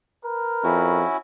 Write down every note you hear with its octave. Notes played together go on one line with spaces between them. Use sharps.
A#4 B4
F2 C#4 E4 F#4